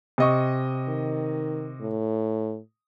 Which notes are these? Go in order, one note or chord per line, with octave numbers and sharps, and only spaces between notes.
C3 D#5 C#6
D#3
A2